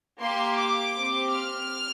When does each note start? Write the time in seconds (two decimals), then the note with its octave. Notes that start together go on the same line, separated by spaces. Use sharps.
0.19 A#3 G4 C6
0.56 D6
0.94 C4 G4
1.30 F6